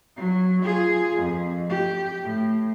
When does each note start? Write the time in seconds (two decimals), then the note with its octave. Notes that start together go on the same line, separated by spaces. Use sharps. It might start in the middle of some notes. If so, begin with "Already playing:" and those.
0.16 F#3
0.62 F4 G#4
1.15 F2
1.69 G4
2.24 A2